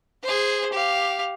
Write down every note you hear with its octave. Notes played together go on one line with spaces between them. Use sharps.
G#4 C5
G4 F5